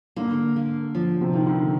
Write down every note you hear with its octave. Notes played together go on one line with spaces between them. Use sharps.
D3 A#3
A#3
F3
C3
D#3 A#3
D3